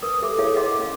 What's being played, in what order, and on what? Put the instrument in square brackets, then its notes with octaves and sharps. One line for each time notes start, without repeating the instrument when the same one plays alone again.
[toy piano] A#4 B4 D#6
G4 A4 E5 D6
E4 G#4 A4 C#5 E5 F5
A#4 D#5 E5 F#5 C6 D6
C#4 F5